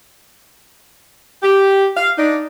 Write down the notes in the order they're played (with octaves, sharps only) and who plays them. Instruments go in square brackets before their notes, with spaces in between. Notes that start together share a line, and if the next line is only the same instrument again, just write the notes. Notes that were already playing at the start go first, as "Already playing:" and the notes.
[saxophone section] G4
F5
D4 D#4